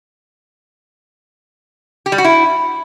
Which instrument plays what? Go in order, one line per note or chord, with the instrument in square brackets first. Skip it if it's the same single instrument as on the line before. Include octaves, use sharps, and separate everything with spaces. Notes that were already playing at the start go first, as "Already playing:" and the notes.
[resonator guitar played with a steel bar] G4
G3
F#4
E4